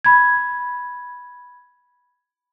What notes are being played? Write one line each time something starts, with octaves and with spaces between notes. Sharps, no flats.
B5 G#6